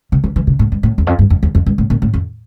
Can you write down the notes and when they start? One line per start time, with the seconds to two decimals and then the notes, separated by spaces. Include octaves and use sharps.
0.12 C3
0.24 E3
0.36 E3
0.47 C3
0.59 A2
0.72 G2
0.83 A2
0.98 E2
1.07 F2
1.19 G2
1.30 F2
1.43 E2
1.55 F2
1.66 G2
1.78 A2
1.90 A#2
2.02 A2
2.14 F2